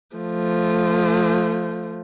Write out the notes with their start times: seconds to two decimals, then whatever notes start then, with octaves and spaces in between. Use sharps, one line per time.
0.16 F3 A3